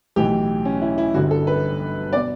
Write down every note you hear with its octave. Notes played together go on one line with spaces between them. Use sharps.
B1 A2 E3 G4
C#4
E4
E4
G1 G2 D3 F#4
A4
B4
B2 D5